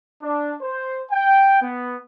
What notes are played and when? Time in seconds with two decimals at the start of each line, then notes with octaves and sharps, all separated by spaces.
0.23 D4
0.62 C5
1.11 G5
1.62 B3